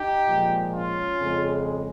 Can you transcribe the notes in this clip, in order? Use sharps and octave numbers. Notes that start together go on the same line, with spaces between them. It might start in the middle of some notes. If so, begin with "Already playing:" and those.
Already playing: D#4 G4
A#2 F3 G#3
C#4 F4
F2 C#3 G#3